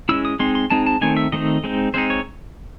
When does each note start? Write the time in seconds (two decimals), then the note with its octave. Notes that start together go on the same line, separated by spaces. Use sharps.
0.09 G#3 C#4 E4 E6
0.25 D#6
0.39 G#3 C4 D#4 C6
0.55 C6
0.70 G#3 C4 D#4 A5
0.86 A5
1.01 D#3 A3 C4 D#4 G#5
1.17 E5
1.32 D#3 A3 C4 D#4 D#5
1.64 G#3 C4 D#4
1.94 G#3 C4 D#4 C5
2.10 C#5